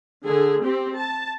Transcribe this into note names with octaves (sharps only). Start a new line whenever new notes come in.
D3 G#4
C4 G4
A5